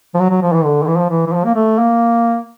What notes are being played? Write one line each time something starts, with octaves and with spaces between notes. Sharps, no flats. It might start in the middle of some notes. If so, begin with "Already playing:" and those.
F3
F#3
F#3
F3
E3
D3
D#3
E3
F3
E3
E3
F3
A#3
A3
A#3